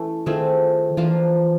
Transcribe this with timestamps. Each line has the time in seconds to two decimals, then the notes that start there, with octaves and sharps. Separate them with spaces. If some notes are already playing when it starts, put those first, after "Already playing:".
Already playing: E3 A3 C#4
0.26 D#3 A3 C4 F4 G#4
0.97 E3 F3 A#3 D4 F4